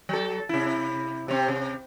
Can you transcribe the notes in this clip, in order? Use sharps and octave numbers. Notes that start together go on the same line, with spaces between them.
F#3 A4
C3 E4
C3 C4
C3